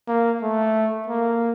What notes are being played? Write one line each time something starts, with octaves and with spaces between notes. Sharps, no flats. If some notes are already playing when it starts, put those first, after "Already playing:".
A#3
A3
A#3